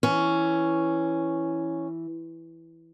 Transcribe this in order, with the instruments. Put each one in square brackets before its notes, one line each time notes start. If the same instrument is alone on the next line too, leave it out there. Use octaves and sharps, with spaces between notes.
[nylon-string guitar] E3 [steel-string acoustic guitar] C#4